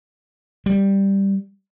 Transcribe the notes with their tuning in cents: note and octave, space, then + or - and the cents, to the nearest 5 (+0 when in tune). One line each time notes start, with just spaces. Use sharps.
G3 +5